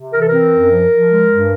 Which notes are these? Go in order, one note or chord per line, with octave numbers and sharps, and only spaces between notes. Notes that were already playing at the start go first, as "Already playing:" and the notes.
Already playing: C3
E3 A#4
A4
C4 A#4
F#2
F3
F3
G#3
G2